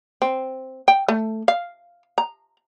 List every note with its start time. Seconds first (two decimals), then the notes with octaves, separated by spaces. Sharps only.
0.22 C4
0.88 G5
1.08 A3
1.48 F5
2.18 A#5